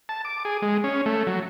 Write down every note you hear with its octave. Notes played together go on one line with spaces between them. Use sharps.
A5
D6
G#4
G#3
C#4
A3
F#3